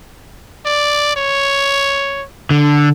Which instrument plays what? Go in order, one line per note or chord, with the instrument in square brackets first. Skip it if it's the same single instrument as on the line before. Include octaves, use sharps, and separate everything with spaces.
[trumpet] D5
C#5
[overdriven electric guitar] D3